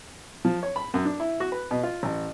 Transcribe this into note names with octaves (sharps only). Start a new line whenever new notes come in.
F3
C#5
B5
F#2
D4
E4
F#4
B4
B2
F4
A1